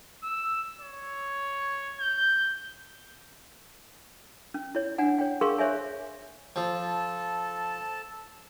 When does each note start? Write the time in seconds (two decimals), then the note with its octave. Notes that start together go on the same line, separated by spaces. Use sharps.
0.23 E6
0.81 C#5
2.00 G6
4.54 C#4
4.75 E4 C#5
4.98 D4 F#5 G#5
5.19 C#5 G5
5.41 G#4 A#4 F5 C6 C#6 E6
5.58 C5 C#5 E5 G#5
6.56 F3 A4 A5